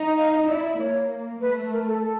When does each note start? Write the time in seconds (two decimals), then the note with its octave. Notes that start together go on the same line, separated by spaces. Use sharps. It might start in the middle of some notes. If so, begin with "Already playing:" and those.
Already playing: D#4
0.17 F5
0.48 E4 D5
0.79 A#3 C#5
1.41 A3 B4
1.72 A#4
1.87 A4
2.03 A4